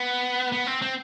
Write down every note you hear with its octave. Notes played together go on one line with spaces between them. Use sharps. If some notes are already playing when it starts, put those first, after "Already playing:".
Already playing: B3
B3
C4
C4